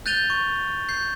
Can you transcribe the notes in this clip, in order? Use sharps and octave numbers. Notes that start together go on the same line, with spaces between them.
F#6 G6 A6 D#7 F7 G7
C#6
G6 C7